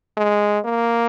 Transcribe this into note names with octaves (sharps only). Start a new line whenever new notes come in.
G#3
A#3